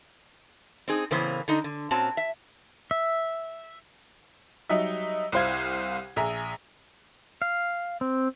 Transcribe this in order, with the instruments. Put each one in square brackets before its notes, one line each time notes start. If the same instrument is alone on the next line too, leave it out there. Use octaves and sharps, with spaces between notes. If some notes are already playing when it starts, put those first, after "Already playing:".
[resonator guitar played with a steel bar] C4 D#4 G#4
A2 C#3 E3 A#3 B3 C5
D3 D#4 D#5
D3
A#2 C4 C#4 F#4 A5
E5
[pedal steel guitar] E5
[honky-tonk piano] F#3 G3 D#4 D#5 E5
C2 E4 C5 F5 G#6
A#1 G#4 E5 A#5
[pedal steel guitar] F5
C4